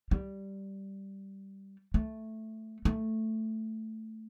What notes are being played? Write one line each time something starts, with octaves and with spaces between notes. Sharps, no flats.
G3
A3
A3